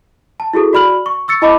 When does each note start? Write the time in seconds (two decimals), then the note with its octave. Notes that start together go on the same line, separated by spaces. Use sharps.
0.40 A5
0.53 E4 F#4 G#4 A4
0.73 F#4 D5 B5 F6 F#7
1.06 C#6
1.28 C#6 E6 A6 C#7
1.42 E4 D#5 A5 B5 D6